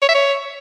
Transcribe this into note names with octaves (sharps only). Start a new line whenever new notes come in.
C#5
E5
C#5